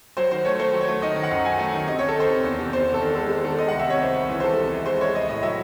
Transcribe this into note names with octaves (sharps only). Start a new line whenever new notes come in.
F#3 C5
D#3 C5
A3 C#5
A3 C5
F#3
C#5
A3
D#3 D#5
D#3
F#5
F#2
F#3 G#5
A3
D#3
C3 D#5
C#5
D#3
A4
D#3 C5
C3
E2
C3
E2 C5
C3
A4
D#3
G#3 A4
G#3
D#3 A4
G#3 D#5
F#5
C2
E5
C3 C#5
C2 C5
C2
E3
C5
G#3 A4
C3
C2
G#3 C5
G#3 C#5
C2 D#5
A2 D#5
F#3 E5